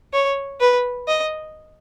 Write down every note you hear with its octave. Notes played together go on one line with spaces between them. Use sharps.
C#5
B4
D#5